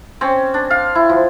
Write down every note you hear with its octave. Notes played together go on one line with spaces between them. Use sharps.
C4 C#4
D4
F5
E4
F3